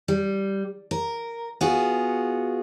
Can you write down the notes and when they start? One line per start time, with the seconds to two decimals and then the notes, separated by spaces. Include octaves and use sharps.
0.08 G3
0.91 A#4
1.61 B3 F4 F#4 G#4